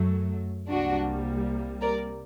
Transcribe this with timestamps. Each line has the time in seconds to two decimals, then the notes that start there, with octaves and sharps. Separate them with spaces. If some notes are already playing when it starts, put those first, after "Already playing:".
Already playing: F#2 F#3 A3
0.68 C2 C3 G3 A#3 D4 F#4
1.82 A#4 D5